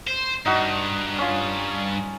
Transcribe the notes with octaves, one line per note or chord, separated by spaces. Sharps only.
C5
G2 D#4 F#4
C#4 F4